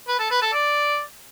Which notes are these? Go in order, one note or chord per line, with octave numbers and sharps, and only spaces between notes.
B4
A4
B4
A4
D5